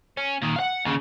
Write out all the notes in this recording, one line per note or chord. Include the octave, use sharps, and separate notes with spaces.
C#4
A#2 D#3
F5 F#5
D#2 C#3